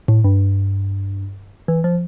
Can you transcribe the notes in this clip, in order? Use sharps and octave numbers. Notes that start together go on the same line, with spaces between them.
A2
G2
E3
F3